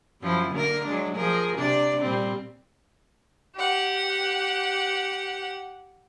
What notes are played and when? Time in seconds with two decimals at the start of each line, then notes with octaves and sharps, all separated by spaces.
0.22 F#2 F3 E4
0.51 D3 A#3 A#4
0.85 F#3 G#3 D4
1.15 F3 G#4 A#4
1.57 C3 D4 D5
2.02 A#2 G3 C4
3.56 G4 F#5